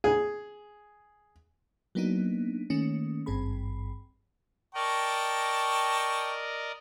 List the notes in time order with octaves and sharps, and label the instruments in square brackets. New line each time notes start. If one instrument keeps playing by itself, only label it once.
[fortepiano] G#4
[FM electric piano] F#3 A#3 B3 D4 D#4
D#3 A3 A#3 C#4
G#1 G2 C4 G#4 B5
[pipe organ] A#4 D5 D#5 [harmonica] G5 A5 C#6